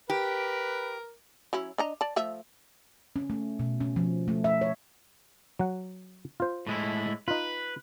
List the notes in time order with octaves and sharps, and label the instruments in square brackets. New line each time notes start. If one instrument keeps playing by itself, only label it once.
[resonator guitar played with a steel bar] G4 [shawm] A#4 [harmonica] B4
[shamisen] F#3 C#4 E4
D4 D#5 A#5
D5 A5
F3 A3 E5
[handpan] C#4
A3
B2
C#4
F3
A3
E5
C#5
[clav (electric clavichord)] F#3 F#5
F4 C5
[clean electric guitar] A2 G#3 E4
[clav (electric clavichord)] D#4 F4 [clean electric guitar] B4